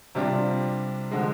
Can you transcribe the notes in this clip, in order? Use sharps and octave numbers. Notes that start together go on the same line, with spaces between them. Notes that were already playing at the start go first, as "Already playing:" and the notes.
C3 G3 D4 F4
D3 F3 G#3